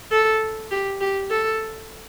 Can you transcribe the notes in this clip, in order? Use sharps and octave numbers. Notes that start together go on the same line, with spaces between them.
A4
G4
G4
A4